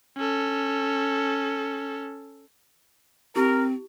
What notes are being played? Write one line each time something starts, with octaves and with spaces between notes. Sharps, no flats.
C#4 A4
C4 E4 G4 A#4